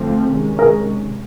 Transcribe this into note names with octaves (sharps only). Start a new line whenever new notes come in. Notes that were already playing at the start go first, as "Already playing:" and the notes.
Already playing: D3 F3 A3 C4
C3 D#3 G#3 C#4
G#4 A#4